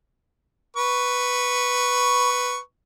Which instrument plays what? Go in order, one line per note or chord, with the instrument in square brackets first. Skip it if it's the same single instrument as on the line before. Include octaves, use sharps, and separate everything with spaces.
[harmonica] B4 C#6